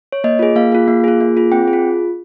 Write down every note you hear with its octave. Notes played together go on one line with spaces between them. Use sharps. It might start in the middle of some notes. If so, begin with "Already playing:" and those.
C#5
A#3 D#5
F4 G#4
A#3 F5
F4 G#4
A#3
F4 G#4
A#3
F4 G#4
C4 G5
G#4
F4